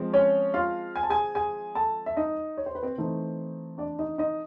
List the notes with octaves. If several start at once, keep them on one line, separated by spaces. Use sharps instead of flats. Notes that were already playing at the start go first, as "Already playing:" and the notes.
Already playing: F3 G#3 C4
C#4 C#5
F4 F5
G#5
A5
G#4 G#5
G#4 G#5
A4 A5
E5
D#4 D#5
C#5
C5
B4
C4 C5
E3 A3 C4 D#4
D4 D5
D#4 D#5
D#4 D#5